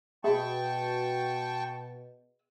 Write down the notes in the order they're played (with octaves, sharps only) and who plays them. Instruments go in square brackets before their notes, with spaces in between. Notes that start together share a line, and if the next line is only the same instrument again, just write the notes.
[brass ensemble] B2 [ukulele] G#4 E5 B5 [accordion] G5 A5 C#6